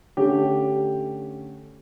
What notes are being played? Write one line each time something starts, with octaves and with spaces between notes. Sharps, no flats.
D3 A3 C#4 G4